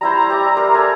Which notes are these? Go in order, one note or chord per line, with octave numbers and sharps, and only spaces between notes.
G3 E4 C5 A#5
G4 D5 E5
A#4 C5 D5
A4 G#5